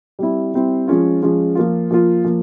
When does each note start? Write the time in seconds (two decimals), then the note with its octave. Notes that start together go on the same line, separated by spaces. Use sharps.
0.19 G3 C4 E4
0.54 G3 C4 E4
0.87 F3 G#3 C#4 F4
1.22 F3 G#3 C#4 F4
1.55 F3 A#3 F4
1.91 F3 A#3 F4
2.25 F3 A#3